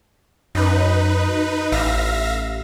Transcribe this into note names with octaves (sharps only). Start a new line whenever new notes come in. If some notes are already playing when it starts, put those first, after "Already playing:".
F#2 D#4 B4
A1 E5 F5 A#6